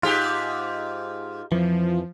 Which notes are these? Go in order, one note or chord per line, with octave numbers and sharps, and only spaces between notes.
G#2 F4 G4
F2 E3 F3